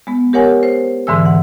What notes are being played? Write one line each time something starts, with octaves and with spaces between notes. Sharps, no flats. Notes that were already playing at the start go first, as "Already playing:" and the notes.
G#3 B3
G4 A#4 C#5 F#5 G#5
C5
G#2 D3 E3 G#3 E6
F#5